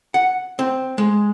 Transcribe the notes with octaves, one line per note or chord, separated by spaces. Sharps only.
F#5
C4
G#3